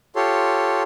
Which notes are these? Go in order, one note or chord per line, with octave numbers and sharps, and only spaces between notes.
F4 G4 A4 C#5 C6